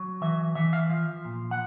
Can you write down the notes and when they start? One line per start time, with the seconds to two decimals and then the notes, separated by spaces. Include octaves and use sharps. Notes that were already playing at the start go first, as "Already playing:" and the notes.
Already playing: F#3
0.21 E3 E5
0.55 E3 E5
0.73 F5
0.89 F3
1.25 A#2
1.51 F#5